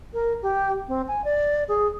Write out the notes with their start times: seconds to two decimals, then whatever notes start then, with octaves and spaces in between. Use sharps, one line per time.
0.13 A#4
0.42 G4
0.88 C4
1.08 G#5
1.24 D5
1.68 G#4